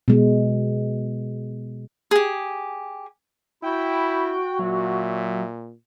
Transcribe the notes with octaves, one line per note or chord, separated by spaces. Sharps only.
B2 G#3
G4 G#4
E4 F#4 G5 B5
A#2 F#3 E5